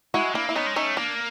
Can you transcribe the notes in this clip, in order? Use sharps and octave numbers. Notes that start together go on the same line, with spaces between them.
G#3 E4 F#4
A#3 D4 E4
E4
B3 C#4 D#4
G#3
A3 C#4 D#4
A#3 D4